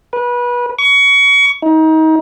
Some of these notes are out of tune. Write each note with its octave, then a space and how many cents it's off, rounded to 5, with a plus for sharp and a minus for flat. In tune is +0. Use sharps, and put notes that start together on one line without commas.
B4 -25
C#6 +25
D#4 +30